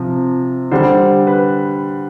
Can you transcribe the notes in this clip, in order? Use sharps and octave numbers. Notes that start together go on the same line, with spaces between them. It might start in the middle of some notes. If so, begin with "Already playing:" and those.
Already playing: C3 F3
D3 G3 C5
B4